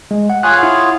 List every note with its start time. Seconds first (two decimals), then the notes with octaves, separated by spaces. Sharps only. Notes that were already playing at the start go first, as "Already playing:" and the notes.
0.11 G#3
0.30 F#5
0.43 F4 G#4 C#5 G#5 F#6
0.59 E4 F#5